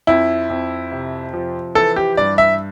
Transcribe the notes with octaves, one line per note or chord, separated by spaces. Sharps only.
F2 E4
F2
C3
F3
E3 A4
G4
G2 D5
E5